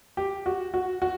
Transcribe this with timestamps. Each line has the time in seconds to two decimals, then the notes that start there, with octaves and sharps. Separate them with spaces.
0.17 G4
0.46 F#4
0.74 F#4
1.02 F#4